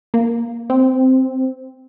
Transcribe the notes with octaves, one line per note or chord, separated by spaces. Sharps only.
A#3
C4